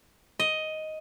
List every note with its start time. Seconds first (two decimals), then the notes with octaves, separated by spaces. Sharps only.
0.39 D#5